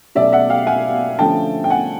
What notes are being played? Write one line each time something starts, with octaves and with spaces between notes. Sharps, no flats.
B2 F#3 A3 C#4 D5 E5
E5 F#5
F5 G5
F#5 G#5
D3 F3 A3 C#4 G5 A5
G5
F#5 G#5